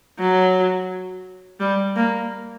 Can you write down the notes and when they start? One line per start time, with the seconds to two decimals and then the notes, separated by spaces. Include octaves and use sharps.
0.19 F#3
1.59 G3
1.96 A#3